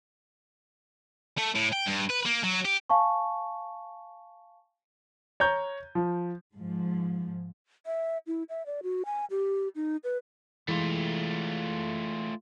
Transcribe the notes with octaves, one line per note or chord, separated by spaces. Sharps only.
A3
A2
G5
G2
B4
A#3
F#3
G4
F5 G#5 A5 C#6
C#5 A#5 G6
F3
G#2 F3
E5
E4
E5
D5
F#4
G#5
G4
D#4
B4
E3 G#3 A3 F4